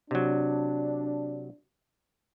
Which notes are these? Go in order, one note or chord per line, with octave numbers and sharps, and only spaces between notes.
C3 F#3 D4